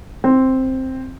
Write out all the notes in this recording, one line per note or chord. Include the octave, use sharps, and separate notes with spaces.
C4